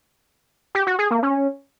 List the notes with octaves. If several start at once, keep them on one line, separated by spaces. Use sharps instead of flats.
G4
F#4
G#4
A#3
C#4